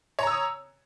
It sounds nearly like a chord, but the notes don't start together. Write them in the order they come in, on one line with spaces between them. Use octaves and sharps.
C#5 A#5 E6 D#6